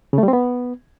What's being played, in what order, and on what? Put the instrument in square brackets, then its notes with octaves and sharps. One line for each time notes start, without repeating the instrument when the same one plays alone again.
[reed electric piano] C#3
A3
G3
C4
B3